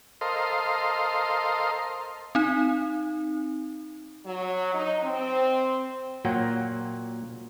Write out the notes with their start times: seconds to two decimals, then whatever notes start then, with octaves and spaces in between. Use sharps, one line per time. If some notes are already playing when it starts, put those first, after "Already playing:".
0.21 A4 A#4 C5 D#5 F5 C6
2.35 C4 D#4
4.26 F#3
4.74 D#4
5.04 C4
6.25 A#2 F#3 A#3 F#5 G5